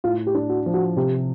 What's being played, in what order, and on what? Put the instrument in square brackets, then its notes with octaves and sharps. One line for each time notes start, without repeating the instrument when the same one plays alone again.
[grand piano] A2 [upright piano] F4
[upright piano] G4
[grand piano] D4
[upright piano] F#4
[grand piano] F3
[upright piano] F#4
[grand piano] C3 [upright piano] G4